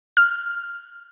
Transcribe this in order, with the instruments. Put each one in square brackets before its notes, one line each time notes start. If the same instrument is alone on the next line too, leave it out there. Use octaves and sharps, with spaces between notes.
[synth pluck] F6